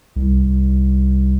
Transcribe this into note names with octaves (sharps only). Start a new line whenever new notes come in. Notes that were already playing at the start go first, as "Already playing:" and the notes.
C2